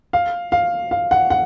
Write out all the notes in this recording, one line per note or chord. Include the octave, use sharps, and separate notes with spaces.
F5
F5
F5
F#5
F#5